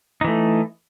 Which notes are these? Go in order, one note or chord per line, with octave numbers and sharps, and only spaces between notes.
E3 A3 D#4